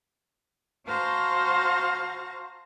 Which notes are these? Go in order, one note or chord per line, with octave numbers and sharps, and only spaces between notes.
F#4 C5 F5 A5 A#5